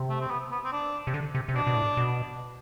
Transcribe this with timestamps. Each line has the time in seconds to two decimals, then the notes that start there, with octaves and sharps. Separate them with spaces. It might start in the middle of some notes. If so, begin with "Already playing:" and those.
Already playing: C3
0.09 A3
0.20 C4
0.31 B3
0.52 B3
0.64 C4
0.72 D4
1.07 C3
1.14 D3
1.35 C3
1.49 C3
1.55 B2 D4
1.67 B2
1.76 A2
1.97 B2